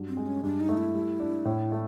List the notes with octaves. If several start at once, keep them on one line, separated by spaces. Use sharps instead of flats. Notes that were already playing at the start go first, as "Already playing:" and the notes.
Already playing: G2 F#3
C4
G#3
C#4
G2 D4
D#4
A3
E4
G3
D4
A2
A3